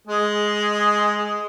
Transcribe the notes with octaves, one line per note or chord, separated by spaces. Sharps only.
G#3 G#4